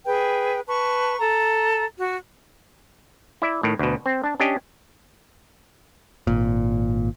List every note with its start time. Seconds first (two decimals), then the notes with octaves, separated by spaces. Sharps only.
0.06 G#4 B4 G5
0.67 B4 A5 C#6
1.19 A4 A#5
1.98 F#4
3.42 E4 D5 E5
3.63 A2 D#3
3.79 D2 B2
4.06 C4
4.24 D4 A5
4.40 C#4 D4 G4 D#5
6.27 G#1 A#2